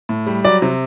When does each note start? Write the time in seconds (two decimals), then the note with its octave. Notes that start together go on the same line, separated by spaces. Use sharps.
0.09 A2
0.27 G3
0.44 F#3 D5
0.62 C3